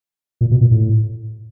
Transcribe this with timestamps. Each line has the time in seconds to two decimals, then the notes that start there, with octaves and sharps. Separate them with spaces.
0.41 A#2
0.51 B2
0.61 A#2
0.71 A2